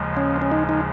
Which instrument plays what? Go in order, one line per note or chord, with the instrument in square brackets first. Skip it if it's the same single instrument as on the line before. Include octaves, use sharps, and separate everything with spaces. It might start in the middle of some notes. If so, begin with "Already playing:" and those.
Already playing: [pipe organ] D#2 C#3 F3 G#3
[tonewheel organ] C#4
C#4
D#4
D#4